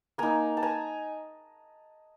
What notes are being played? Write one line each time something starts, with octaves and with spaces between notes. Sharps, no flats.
A#3 D#4 G#5 A#5
A5
G#5 A#5